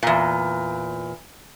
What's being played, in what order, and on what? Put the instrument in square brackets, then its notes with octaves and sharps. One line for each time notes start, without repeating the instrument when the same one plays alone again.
[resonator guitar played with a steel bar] E2 A#2